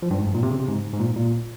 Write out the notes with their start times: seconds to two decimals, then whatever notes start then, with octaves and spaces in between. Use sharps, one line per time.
0.02 F3
0.11 G2
0.18 G#2
0.27 G2
0.34 A#2
0.43 C3
0.51 C#3
0.60 C3
0.68 G#2
0.93 G#2
1.00 A#2
1.16 A#2